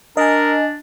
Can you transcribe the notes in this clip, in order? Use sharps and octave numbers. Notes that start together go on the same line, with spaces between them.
D4 A#4 D#5 G#5